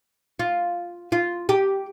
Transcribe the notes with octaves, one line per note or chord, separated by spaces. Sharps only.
F4
F4
G4